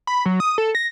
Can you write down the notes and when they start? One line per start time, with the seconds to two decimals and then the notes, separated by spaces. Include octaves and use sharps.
0.07 B5
0.26 F#3
0.40 D#6
0.58 A4
0.75 A#6